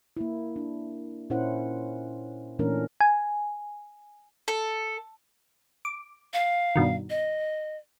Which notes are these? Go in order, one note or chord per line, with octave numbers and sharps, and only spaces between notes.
A#3 E4
D4
A#2 C#4 E4 A#4 C5 F#5
A#2 E3 A3 C#4 D4 A#4
G#5
A4
D6
F5
G2 B2 D#3
D#5